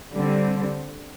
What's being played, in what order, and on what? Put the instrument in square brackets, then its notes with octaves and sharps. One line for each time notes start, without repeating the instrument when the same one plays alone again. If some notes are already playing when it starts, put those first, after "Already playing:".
[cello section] D3 G3 C4